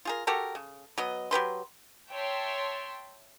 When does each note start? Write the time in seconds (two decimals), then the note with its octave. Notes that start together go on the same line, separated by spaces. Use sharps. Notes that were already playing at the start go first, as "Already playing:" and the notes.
0.05 F4 G#4 A#4
0.27 F#4 G4 A4 A#4
0.55 C#3
0.98 F#3 B3 D#5
1.31 F#3 G4 B4 C6
2.10 C#5 E5 G5 A5 C6